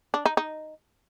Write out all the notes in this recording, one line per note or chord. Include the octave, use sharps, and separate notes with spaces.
D4
D#4
D#4